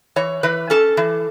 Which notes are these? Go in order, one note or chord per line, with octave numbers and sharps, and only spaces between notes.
E3 C#5
E3 B4
C#4 A4
E3